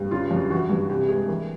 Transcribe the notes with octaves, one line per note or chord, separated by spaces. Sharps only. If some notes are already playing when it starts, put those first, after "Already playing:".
Already playing: G2
C#3 F4
F#2
E3 F#4
G2
C3 G4
G#3 G#4
E3 A#4